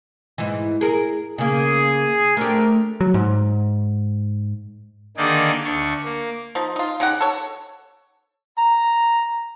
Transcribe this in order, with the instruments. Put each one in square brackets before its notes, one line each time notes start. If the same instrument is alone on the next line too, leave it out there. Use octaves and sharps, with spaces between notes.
[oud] G#2 E3
G#4 A#4
[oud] C#3 A#3 [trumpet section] G#4
[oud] A3 G4 [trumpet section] C4 D4 A#4
[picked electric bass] F#3
G#2
[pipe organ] D3 D#3 A#3 D#4 G#4 D5
D2 D4 C#6
A#3
[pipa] F3 D#4
D#4 F4
C#3 D#4 G4 F#5
A4 C#5
[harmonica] A#5